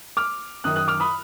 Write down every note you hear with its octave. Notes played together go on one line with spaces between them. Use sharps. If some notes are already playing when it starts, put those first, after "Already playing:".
D6 F6
F#2 D#3 D#6 F#6
D#6 F#6
D6 F6
B5 D#6